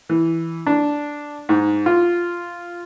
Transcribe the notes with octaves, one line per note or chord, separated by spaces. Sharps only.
E3
D4
G#2
F4